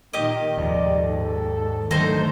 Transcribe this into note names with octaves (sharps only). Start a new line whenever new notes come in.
A#2 D#3 A#3 G4 D#5
F1 D#2 G#2 D5
G#2 A4
D3 D#3 F#3 A3 D#4 C5